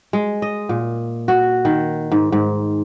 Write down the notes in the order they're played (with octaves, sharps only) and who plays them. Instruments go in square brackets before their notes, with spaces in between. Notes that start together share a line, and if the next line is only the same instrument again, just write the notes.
[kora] G#3
D#5
A#2
F#4
D#3
G#2
G#2